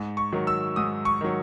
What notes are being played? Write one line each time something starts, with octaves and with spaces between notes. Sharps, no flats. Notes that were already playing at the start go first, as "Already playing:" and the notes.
Already playing: G#2
C#6
D#3 F#3
E6
G#2 D#6
C#6
D#3 F#3